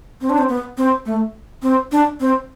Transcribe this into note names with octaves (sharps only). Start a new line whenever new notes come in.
C4
D4
C4
B3
C4
A3
C4
D4
C4